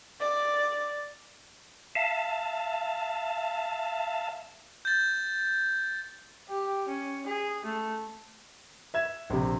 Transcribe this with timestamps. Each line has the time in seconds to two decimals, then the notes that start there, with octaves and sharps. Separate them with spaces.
0.20 D5
1.95 E5 F5 A5
4.85 G6 A6
6.49 G4
6.88 C#4
7.26 G#4
7.65 A3
8.94 E5 G#6 E7
9.30 A#1 C3